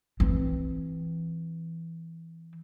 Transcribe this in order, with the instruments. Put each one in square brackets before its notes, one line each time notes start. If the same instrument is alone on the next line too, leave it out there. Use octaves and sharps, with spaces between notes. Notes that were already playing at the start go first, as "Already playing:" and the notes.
[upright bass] E3 C4